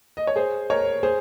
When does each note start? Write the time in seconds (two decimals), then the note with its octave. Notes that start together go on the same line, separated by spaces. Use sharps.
0.17 D#5
0.27 C#5
0.36 G#4 C5
0.70 A#4 C#5
1.03 G#4 C5